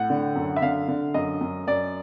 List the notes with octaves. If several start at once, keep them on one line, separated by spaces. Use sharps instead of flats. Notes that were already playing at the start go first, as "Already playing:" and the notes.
Already playing: A2 F#5
D3
F#2
E5
D3 F5
D3
F#2 D#5
F#2
F#2 D5